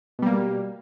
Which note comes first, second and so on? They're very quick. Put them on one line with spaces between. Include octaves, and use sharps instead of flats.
B2 G3 A#3